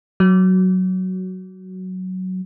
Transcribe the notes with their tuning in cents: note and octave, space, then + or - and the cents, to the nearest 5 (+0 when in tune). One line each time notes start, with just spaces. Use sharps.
F#3 +5